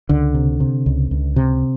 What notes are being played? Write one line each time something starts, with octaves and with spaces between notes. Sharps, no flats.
C#2 D3
C3
C3
C#2
C#2
C3